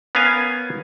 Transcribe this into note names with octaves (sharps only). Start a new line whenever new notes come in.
B3 C#4 A#4 F5 G#5